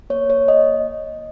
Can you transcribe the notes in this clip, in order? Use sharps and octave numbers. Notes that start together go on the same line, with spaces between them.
A#3 C#5
A#3 C#5
A#3 D#5